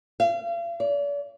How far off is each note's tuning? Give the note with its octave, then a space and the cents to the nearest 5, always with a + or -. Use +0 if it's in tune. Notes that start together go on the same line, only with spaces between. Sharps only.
F5 -40
D5 -40